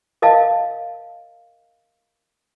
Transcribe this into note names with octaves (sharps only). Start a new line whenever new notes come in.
A#4 D#5 F5 A5